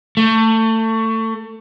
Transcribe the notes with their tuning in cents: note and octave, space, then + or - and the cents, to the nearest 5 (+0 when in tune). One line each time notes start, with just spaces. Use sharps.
A3 +25